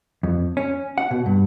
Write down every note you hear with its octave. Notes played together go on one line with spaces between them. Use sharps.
F2
C#4
F#5
B2
G2